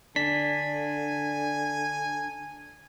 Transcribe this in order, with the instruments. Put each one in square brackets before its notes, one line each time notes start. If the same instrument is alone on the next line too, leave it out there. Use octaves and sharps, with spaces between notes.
[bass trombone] D3 [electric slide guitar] D4 [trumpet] G#5 [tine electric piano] B6